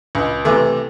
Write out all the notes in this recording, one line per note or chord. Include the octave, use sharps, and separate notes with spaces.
C#2
C3 E3 A3